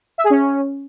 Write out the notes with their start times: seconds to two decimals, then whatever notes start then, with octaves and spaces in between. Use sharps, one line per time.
0.18 E5
0.24 G#4
0.30 C#4